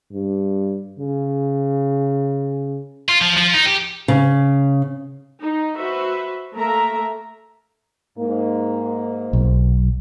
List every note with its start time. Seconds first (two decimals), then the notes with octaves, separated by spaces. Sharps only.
0.13 G2
0.99 C#3
3.09 F4
3.21 F3
3.37 F3
3.54 D#4
3.66 G4
4.08 C#3
5.40 D#4
5.75 F#4 B4 C5 E5
6.54 A3 A#3 A#4 E5 A#5
8.18 G#2 A#3
9.33 B1